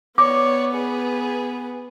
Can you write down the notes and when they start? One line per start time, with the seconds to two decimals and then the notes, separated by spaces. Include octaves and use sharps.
0.18 B3 C#5 D5 D6
0.74 G#4 B4